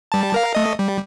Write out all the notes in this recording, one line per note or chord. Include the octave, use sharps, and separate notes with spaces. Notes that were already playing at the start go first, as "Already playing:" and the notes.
G3 A5
A#4 F5
A3 D#5
G3